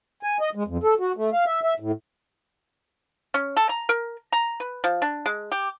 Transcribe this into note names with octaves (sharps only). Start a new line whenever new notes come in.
G#5
D#5
G#3
F2
A4
F#4
A3
F5
E5
E5
A2
C#4
A4
A#5
A#4
A#5
B4
F3
D4
G#3
G4